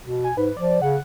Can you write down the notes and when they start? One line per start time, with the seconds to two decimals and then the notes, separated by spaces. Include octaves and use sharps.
0.04 B2
0.24 G#5
0.37 G#2 B4
0.57 F3 D5
0.82 C#3 F#5